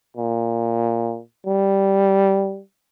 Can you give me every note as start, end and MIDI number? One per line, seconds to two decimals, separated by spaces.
0.17 1.20 46
1.47 2.61 55